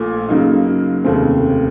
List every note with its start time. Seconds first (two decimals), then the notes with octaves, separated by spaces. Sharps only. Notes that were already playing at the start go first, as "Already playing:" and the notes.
Already playing: A#1 A#2 A3
0.29 F#2 C#3 F#3 A#3 D#4
1.04 F1 D#2 C#3 A3 C4